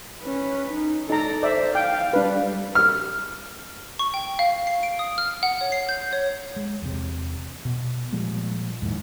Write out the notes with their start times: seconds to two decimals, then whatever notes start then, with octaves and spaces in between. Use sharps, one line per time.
0.22 C#4 B4
0.71 D#4
1.10 D#4 A4 D5 A#5
1.43 C5 D5 E5
1.75 F5 G5
2.13 G3 D4 B4
2.75 F6
3.99 C#6
4.14 G5
4.39 F5
4.67 C7
4.83 D7
4.99 D#6
5.18 F6
5.43 F#5
5.61 C#5
5.72 C7
5.89 G6
6.13 C#5
6.56 G#3
6.82 E2 C3
7.65 B2
8.13 A#2 F3 G3 G#3
8.82 D#2 G#2 D#3 E3